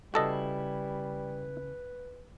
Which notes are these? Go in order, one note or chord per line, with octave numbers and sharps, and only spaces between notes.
C#3 G3 E4 F#4 A4 B4 D#5